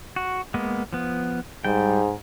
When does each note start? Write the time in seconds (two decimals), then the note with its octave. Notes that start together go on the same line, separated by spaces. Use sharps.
0.16 F#4
0.54 G#3 A#3 B3
0.93 F3 B3
1.64 G#2 G3 G5